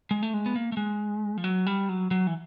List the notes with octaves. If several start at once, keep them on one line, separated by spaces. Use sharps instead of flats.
G#3
A3
G#3
B3
A#3
A3
G#3
F3
F#3
G3
F#3
F#3
E3